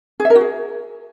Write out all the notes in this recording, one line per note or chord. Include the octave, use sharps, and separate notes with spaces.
G#4
E5
A#4
F#4
G#4